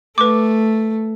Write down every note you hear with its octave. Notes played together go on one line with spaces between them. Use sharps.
A3 B4 D6